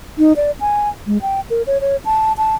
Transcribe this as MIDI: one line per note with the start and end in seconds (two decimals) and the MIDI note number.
0.18 0.33 63
0.36 0.51 74
0.60 0.89 80
1.07 1.21 56
1.22 1.41 79
1.50 1.62 70
1.67 1.78 73
1.81 1.96 73
2.05 2.33 81
2.38 2.55 81